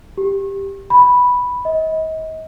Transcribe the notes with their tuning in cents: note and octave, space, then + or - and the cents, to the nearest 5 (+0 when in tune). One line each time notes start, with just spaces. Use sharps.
G4 +5
B5 -5
D#5 +35